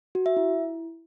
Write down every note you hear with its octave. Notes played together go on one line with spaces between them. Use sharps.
F#4
E5
E4